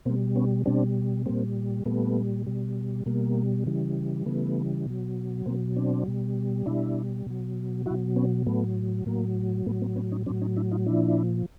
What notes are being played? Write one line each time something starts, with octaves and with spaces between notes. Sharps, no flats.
B2 G3 A#3 C4
B3 C#4
B2 G3 C4 D4
A#2 G3 A#3 C4
A#2 G3 A3 B3
B2 G3
B2 G3 A#3
C#3 E3 G3
C#3 E3 G3 A3 B3
B2 F#3
B2 F#3 A#3 C4
C4 D4
B2 G3
B2 G3 D4 E4
B2 F#3
B2 F#3 E4 F#4
B3 C#4
A2 F#3 A3 B3
A2 F#3 A#3
A2 F#3 A3 B3
A#3 C4
B3 C#4
C#4 D#4
A2 F#3 C4 D4
C#4 D#4
D4 E4
D#4 F4
A#2 F3 D4 E4